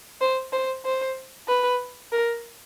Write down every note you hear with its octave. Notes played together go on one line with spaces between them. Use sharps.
C5
C5
C5
B4
A#4